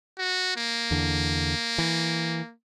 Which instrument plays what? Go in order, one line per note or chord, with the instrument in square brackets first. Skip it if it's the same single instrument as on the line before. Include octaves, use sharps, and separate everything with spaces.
[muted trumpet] F#4
A#3
[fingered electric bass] E2 D3
E3